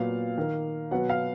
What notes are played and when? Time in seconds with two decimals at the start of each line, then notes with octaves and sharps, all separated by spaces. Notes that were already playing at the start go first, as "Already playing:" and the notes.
Already playing: A#2 F#3 B3 F5
0.38 D#3 A#3
0.91 B2 F#3 B3 F#5
1.09 F5